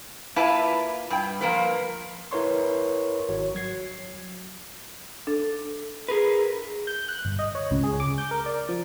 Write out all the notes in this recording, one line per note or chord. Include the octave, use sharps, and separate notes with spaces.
A#3 E4 F4 B4 E5 A5
G2 G5
F3 A#3 A#4 B4
E4 A#4 B4 C#5 C6 C#6
G#1 F#4 C#5
F#3 G#6 C7
D4 A4
G#4 A#4 B4
G6
F#6
G1
D#5
C#5
C#2
G#4
D6
G6
A#4
D5
F3